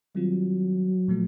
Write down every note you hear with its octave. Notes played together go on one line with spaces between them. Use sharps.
D#3 F#3 G3 C4 F4
A#2 F3 A3